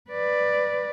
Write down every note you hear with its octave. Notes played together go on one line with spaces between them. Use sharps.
B4 D5